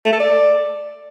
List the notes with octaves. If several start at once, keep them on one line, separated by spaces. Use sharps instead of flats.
A3
A4
D5